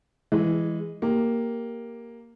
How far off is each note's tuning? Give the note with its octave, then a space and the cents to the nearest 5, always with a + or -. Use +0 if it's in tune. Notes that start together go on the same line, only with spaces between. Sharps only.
E3 +0 G#3 -15
A#3 +0 G4 +0